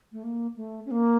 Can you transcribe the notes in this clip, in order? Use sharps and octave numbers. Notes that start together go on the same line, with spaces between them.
A3
A#3
A3
C#4
A#3